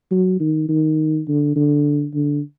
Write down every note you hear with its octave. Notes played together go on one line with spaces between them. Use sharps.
F#3
D#3
D#3
D3
D3
D3